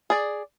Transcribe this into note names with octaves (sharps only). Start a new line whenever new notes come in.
G#4 D5